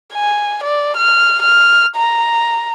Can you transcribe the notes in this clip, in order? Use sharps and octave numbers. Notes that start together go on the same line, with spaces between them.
G#5
D5
F6
F6
A#5